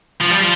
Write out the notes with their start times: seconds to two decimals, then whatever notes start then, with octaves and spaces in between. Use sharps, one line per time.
0.21 F3
0.30 G3
0.40 F3